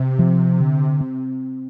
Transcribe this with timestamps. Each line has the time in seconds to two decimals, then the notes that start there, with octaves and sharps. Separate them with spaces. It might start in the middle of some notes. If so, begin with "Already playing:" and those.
Already playing: C3
0.19 F3
0.60 D3
1.01 C4